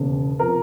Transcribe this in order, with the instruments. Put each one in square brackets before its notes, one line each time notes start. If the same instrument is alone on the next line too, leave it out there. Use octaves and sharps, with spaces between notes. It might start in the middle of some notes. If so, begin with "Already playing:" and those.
Already playing: [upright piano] E1 D#2 C#3
C3 F3 A#4